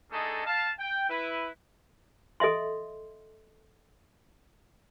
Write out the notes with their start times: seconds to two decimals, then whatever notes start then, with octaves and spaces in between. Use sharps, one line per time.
0.12 A3 D4 D#4 G#4 A4 D#5
0.46 F5 A5
0.79 G5
1.10 E4 B4
2.40 A4 D#5 E5 C6